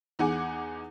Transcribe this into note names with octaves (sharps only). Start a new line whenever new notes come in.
E2 D#4 G#4 F#5 G#5 D6